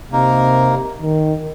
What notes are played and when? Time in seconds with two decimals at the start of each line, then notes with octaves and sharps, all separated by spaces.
0.12 C3 A#3 D#4 A#4
1.02 D#3